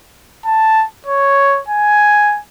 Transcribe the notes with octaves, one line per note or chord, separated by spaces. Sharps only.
A5
C#5
G#5